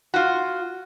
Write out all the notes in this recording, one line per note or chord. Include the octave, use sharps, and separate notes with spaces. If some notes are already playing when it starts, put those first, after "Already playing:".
F4 F#4